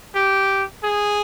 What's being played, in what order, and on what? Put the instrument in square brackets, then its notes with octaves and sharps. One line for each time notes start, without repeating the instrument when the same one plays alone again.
[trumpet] G4
G#4